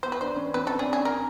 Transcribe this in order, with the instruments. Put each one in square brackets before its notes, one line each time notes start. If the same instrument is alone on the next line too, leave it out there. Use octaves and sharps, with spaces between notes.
[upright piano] B3 [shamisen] C5
[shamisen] B4
[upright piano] D4 [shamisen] C5
[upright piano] C#4
[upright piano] C4 [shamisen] B4
[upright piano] C#4 [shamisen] A4
[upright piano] D4 [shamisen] G#4
[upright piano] C#4 [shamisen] G#4
[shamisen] A#4